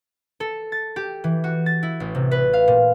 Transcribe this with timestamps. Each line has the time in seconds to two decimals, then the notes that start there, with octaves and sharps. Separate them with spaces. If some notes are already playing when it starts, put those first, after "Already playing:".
0.40 A4
0.72 A6
0.96 G4
1.24 E3
1.44 F#4
1.66 A6
1.83 E4
2.00 A1
2.15 C3
2.31 B4
2.53 F5
2.68 A#2